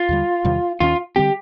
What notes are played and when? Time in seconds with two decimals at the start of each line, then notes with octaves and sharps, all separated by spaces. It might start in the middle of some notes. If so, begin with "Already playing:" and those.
Already playing: F4
0.09 D#2 D3 G3
0.45 E2 C3 D#3 G3
0.80 D#2 D#3 G#3 C#4 F4
1.16 D3 G3 C4 G4